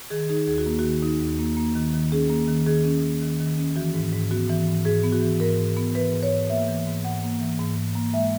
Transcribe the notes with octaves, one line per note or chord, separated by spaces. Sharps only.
D#3 G#4
D#4 G#4
D#2 G#4
F#4
A#3
D#3 F#4
D#4
D#2
A#3
A#3
D#3
D#3
C#4 G#4
A#3
D#3
D#3 G#4
C#4
A#3
D#3
D#3
C#4
E3 F#4
G#2
G#2
B3 F#4
E3
G#2
G#2 G#4
B3
F#4
E3
G#2 A#4
G#2
B3
E3 B4
G#2
C#5
G#2
A#3 E5
E3
G#2
G#2 F#5
A#3
E3
G#2
G#2
A#3
G#3 E5